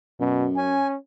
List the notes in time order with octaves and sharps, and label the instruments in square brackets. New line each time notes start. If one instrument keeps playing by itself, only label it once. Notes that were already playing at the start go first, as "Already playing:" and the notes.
[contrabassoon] F#2 [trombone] B2
[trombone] C#4 [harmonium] G#5